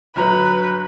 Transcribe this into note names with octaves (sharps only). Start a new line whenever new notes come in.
G1 F#3 B4 A#5